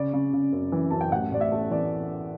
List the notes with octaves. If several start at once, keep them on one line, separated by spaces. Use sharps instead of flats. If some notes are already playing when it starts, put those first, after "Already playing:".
Already playing: C#3 D5
C#3
C#3
F#2
E3
F#2 A5
G5
A1 F#5
A1 D5
E5
A3
E3 D5